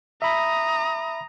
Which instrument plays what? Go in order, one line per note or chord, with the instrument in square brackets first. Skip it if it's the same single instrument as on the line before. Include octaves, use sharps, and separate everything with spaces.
[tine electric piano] E5 B5 [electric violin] A#5 D#6